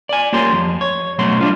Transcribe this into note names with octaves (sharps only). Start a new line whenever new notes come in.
D5 G#5
A#3 F4 G4 C#5 C6
F2
C#5
B2 F#3 A3 C4 C6
G3 D4 F4